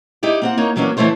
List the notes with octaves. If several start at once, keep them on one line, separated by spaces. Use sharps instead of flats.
D#4 E4 G4 D5
A#3 C4 F#5
A#3 D#4 C#5
E3 F#3 A#3 C#4 D4
D3 E3 A3 E4 C5 C#5